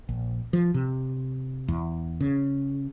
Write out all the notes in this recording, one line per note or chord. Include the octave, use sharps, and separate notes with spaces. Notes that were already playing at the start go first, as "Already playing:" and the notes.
A#1
F3
C3
E2
C#3